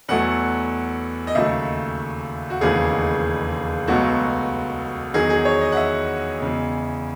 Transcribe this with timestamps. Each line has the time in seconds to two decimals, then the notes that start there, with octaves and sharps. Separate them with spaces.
0.08 E2 B2 F#3 A3 F#5
1.27 D#5
1.35 D#2 C#3 F#3 A3 E5
2.50 F#4
2.61 E1 D#2 C#3 E3 A3 G#4
3.87 C#2 B2 F#3 A3 F#4
5.14 E2 D#3 F#3 G#4
5.30 G#4
5.45 C#5
5.61 D#5
5.72 F#5
5.77 E5
6.40 E2 C#3 G#3